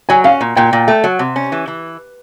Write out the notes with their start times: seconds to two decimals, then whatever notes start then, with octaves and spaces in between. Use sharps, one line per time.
0.09 F#3 G#5
0.24 C#4 F5
0.41 A#2
0.56 A#2 G5
0.73 A#2
0.88 A3
1.04 F#3
1.19 C3
1.36 C#4
1.52 E3
1.68 E3